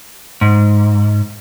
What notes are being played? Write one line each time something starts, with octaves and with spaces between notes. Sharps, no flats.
G#2